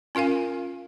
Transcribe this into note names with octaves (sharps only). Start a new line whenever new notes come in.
C#4 F4 A#4 F5 G#5